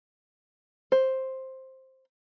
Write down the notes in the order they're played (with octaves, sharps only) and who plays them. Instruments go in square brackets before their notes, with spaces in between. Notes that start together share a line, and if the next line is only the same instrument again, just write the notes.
[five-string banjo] C5